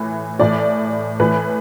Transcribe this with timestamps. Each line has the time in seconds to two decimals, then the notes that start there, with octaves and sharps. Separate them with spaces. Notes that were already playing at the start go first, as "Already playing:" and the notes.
Already playing: A2 E3
0.39 A2 E3 D5
1.20 A2 E3 B4